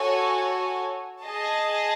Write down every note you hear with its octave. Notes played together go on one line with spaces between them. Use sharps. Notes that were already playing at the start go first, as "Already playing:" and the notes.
Already playing: F#4 A4 C#5 G#5
G#4 D#5 A5